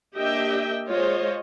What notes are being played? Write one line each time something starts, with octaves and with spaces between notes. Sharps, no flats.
A#3 D4 G4 D#5 E5 G5
G#3 F4 C5 C#5 D#5